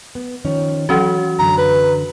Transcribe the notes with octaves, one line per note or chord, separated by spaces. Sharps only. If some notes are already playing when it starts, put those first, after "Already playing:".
B3
D#3 F3 C#4
E3 F#3 C#4 F#4
F#2 D3 A#5
B4